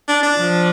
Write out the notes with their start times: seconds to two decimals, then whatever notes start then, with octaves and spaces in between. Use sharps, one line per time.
0.08 D4
0.23 D4
0.37 F3